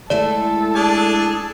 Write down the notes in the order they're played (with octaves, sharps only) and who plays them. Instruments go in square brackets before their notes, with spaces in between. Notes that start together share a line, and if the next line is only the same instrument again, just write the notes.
[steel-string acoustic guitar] G#3 A3 E4 [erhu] A4 [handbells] D5
[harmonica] D4 G#4 A5